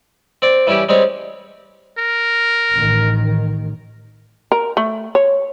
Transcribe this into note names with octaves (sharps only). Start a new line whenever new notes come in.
C4 D5
E3 G3 C#4 E4 G4
G3 G#3 C4 C#4 C#5
A#4
A1 D#3
A#4
A3
C#5